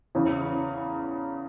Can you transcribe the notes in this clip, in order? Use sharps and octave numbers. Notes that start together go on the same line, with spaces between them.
E2 C#3 E3